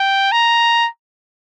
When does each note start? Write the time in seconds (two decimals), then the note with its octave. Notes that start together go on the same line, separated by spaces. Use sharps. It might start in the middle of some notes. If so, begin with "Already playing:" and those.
Already playing: G5
0.32 A#5